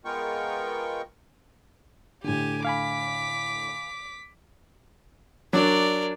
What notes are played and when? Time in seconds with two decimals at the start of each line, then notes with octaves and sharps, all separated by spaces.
0.05 G#3 B3 F4 A#4 G5 C#6
2.24 A2 D3 G4 G#5
2.65 F5 G#5 B5 D6 B6
5.53 F#3 D4 A#4 D5